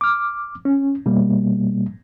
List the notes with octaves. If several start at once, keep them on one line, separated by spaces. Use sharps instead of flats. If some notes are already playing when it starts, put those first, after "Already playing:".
D6 F6
C#4
B2 G3 A#3